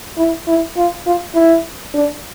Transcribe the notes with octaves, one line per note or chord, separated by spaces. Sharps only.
E4
E4
F4
F4
E4
D4